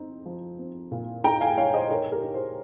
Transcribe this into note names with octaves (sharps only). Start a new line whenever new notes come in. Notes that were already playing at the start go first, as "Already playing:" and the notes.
Already playing: C4 D#4
F3
C4
A#2
D#4 G5 A#5
F5 G#5
D#4 C#5 F5
C5 D#5
D#4 A#4 C#5
G4 A#4
D#4
G#4 C5